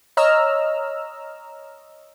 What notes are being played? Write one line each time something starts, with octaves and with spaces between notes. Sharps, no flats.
C#5 D#5 A#5 E6 F6